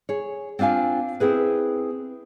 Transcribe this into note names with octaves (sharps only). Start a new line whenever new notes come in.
G#4 C#5
C4 D4 F4 F5 G#5
C4 E4 G#4 B4